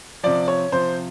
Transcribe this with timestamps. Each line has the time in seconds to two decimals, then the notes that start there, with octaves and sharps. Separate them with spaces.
0.23 C3 F3 D5
0.48 C#5
0.72 C3 F3 C5